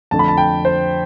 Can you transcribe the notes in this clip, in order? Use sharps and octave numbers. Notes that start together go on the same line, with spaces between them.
F2 D3 A3 A5
B5
A5
G5
C5